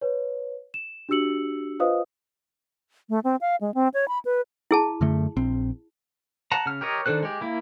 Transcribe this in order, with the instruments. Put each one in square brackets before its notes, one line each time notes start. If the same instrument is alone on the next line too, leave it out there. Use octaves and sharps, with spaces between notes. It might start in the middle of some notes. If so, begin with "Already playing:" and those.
[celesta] B4 C#5
E7
D4 F#4 G4 E6 C#7 F#7
F4 B4 C5 D#5 F5 D#6
[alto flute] A3
C4
F5
G#3
C4
C#5
B5
B4
[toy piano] E4 G#4 A5
[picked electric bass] F#2 D3 A3
A#1 C4
[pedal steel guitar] F#5 A5 A#5
C#3 F6
G4 A#4 C#5 D#5
D#3 D4 A4 C5 F#6
G#3 G4
A#3 E4